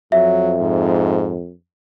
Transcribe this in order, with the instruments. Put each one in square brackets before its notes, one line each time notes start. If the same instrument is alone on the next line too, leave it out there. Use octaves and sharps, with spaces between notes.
[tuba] F2 [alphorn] F#3 [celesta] E5
[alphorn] G#2